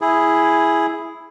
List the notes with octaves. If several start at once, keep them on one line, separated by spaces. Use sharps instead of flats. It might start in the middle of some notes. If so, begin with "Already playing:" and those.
E4 G#4